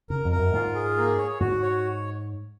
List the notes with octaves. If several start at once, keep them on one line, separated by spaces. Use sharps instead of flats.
C#3 A#4
F2
A#4
F#2
G#2 F4
G#4
A#3
C#5
G#2 F#4
C#5